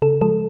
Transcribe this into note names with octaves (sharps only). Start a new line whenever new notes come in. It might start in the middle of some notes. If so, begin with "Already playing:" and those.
C#3 A4
F3 G#3 A4